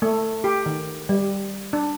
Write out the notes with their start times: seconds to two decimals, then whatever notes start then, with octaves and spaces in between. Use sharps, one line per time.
0.02 A3
0.44 G4
0.66 D#3
1.09 G3
1.73 D4